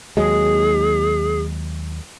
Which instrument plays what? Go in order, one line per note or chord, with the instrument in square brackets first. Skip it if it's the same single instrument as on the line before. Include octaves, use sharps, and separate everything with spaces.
[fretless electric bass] D#2 F#3 G#3 [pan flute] G#4